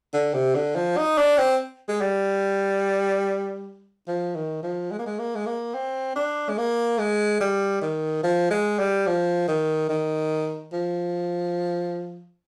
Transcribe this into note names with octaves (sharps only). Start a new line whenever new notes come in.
D3
C3
D3
F3
D#4
D4
C4
G#3
G3
F3
D#3
F3
G#3
A#3
G#3
A#3
G#3
A#3
C4
D4
G#3
A#3
G#3
G3
D#3
F3
G#3
G3
F3
D#3
D#3
F3